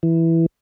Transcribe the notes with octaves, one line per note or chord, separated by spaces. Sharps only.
E3